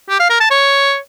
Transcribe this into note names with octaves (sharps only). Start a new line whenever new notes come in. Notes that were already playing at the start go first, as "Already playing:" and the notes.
G4
F5
A#4
A5
C#5